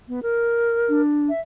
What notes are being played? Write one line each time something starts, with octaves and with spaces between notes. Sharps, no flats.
B3
A#4
D4
E5